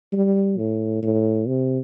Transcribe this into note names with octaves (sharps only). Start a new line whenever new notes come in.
G3
A2
A2
C3